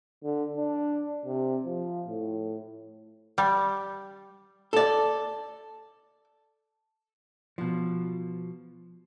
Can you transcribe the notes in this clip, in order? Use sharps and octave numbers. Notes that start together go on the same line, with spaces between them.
D3
D4
C3
F3
A2
G3
A4 D5
B2 F3